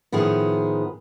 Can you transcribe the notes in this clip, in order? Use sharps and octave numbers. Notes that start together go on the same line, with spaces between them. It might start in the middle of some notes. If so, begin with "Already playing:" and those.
A2 D#3 F3 B3 G#4